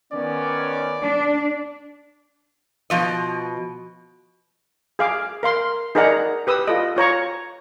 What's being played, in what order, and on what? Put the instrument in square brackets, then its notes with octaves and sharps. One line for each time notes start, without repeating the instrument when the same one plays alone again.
[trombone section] D#3 B3 C#4 [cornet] D5
[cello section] D4
[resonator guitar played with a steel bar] B2 F3 D#5
[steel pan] G#4 F5 D6
A#4 F5 C6
D#4 G#4 A#4 D5 F#5 A#5
G4 B4 D#6 E6
F4 A4 D#5
F4 C#5 A#5 C#6